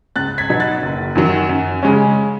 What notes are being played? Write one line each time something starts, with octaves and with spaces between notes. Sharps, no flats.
C#2 F#6 A6
G#6 B6
B2 F#3 B3 D#4 G#6
F#6 A6
F#1
F#2 D#3 F#3
F#2
C#3 G#3 C#4